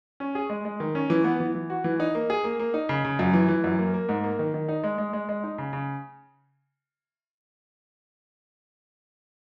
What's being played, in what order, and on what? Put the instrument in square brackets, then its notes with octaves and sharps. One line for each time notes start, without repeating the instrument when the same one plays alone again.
[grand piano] C#4
G#4
G#3
G#3
D#3
C#4
E3
B3
E3
E3
F#4
E3
D#4
A#3
G#4
A#3
A#3
D#4
C#3
C#3
F#2
E3
E3
F#2
A#3
A#3
G#2
A#3
D#3
D#3
D#4
G#3
G#3
G#3
G#3
D#4
C#3
C#3